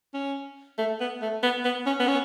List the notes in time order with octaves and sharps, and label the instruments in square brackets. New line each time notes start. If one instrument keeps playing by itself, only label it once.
[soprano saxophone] C#4
A3
B3
A3
B3
B3
C#4
B3
C#4